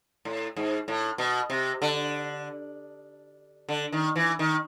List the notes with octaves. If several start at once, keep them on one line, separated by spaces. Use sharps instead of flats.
A2
G#2
A2
B2
C3
D3
D3
D#3
E3
D#3